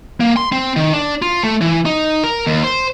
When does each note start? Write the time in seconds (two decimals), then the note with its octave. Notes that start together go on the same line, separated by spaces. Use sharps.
0.20 A#3
0.37 C6
0.52 C4
0.76 D#3
0.93 D4
1.22 F4
1.43 A3
1.61 E3
1.85 D#4
2.23 A#4
2.46 D#2
2.63 C5